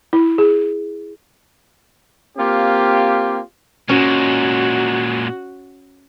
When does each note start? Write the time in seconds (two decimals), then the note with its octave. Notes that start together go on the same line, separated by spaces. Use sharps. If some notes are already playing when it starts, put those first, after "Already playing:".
0.13 E4
0.38 G#4
2.38 A#3 C4 F4 G4
3.89 A#2 G#3 C#4 F#4